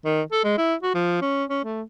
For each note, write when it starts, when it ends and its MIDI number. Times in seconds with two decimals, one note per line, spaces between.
0.05 0.22 51
0.32 0.42 69
0.44 0.55 56
0.58 0.75 64
0.83 0.94 66
0.95 1.17 53
1.22 1.44 61
1.50 1.61 61
1.64 1.82 57